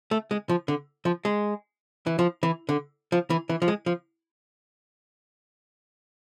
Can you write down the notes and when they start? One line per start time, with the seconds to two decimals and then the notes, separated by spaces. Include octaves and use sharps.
0.11 A3
0.31 G#3
0.49 F3
0.68 D3
1.05 F3
1.25 G#3
2.07 E3
2.19 F3
2.43 E3
2.69 D3
3.12 F3
3.30 E3
3.49 E3
3.62 F3
3.68 G#3
3.86 F3